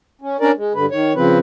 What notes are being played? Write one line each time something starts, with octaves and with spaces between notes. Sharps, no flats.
C#4
C#4 D4 A#4 D5
G#3
G2 D3 B4
D#3 C#5
C#3 F3 C4 B4